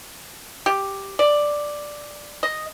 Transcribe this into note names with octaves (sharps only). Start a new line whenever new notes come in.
G4
D5
D#5